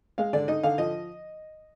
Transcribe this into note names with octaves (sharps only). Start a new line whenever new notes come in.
G#3 F5
D3 D5
D#4 D#5
D3 F5
F3 D#5